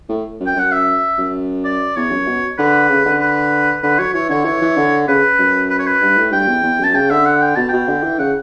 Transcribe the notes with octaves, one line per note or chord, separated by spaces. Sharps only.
A2
F#2
G5
F#2 F#5
E5
F#2
D5
E2 C#5
F#2
B2
D3 B4
C#3
D3
B4
D3 B4
F#3 C#5
E3 C#5
D3 C#5
E3 C#5
E3
D3
C#3 B4
F#2
B4
C#5
B4
G2
A2
G2 G5
E2
E2
F#2 A5
C#3 G5
D3 E5
F#5
G5
B2 A5
B2 G5
D3
E3
C#3 F#5